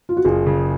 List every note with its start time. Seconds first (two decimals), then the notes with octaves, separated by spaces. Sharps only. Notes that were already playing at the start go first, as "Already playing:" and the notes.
0.09 F4
0.17 F#4
0.24 F#1 F4 G#4
0.47 C#3